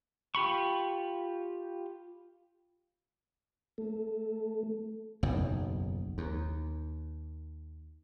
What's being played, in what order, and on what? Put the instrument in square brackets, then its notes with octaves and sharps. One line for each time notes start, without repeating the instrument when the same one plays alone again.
[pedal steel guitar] F4 G4 B5 C#6
[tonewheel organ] A3
[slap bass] F#1 B1 E2
D#2